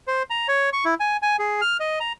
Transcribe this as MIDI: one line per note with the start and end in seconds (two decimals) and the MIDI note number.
0.07 0.23 72
0.30 0.47 82
0.48 0.70 73
0.73 0.85 85
0.85 0.95 64
1.00 1.17 80
1.22 1.36 80
1.39 1.61 68
1.61 1.77 89
1.80 1.99 75
2.00 2.13 82